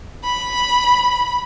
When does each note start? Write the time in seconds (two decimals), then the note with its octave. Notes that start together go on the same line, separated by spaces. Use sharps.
0.24 B5